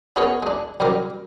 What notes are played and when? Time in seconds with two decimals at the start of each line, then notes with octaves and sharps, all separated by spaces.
0.16 B3 C#4 D#4 G#4 A#4 C#5
0.43 G#3 D4
0.80 C2 F#2 G3 A#4 D6